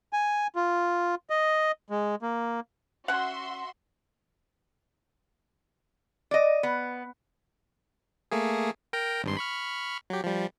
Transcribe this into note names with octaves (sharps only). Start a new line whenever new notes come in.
G#5
F4
D#5
G#3
A#3
C#4 F#4 E5 F#5 C6
D5 D#5
B3
A3 A#3 G#4
A#4 G5 A#5
G#1 G2 C6
B5 C#6 F6
F#3 G4
F3 G3